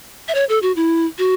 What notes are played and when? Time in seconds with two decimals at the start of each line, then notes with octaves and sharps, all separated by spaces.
0.28 E5
0.35 C#5
0.49 A4
0.62 F#4
0.76 E4
1.18 F#4